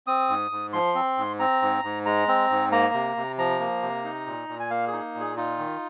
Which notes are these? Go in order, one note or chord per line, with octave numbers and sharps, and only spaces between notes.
C4 D#6
G#2
G#2
F3 C6
C4
G#2
C4 A#5
G#2
G#2
G#3 A#5
C4
G#2
A#3 A#5
C3
C3
F3 A#5
A#3
C3
D#4
A#2
A#2
G#5
A#3 F5
G#4
D#4
A#2
G#4
D#4 F4
D#3